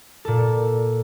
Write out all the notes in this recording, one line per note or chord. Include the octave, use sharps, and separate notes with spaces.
A#2 A4